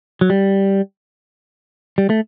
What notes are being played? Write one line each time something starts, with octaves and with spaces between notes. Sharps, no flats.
F#3
G3
G3
A3